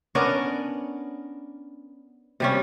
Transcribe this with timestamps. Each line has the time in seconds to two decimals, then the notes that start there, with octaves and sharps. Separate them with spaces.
0.15 B3 C#4 D4 A#4
2.40 C3 G3 C#4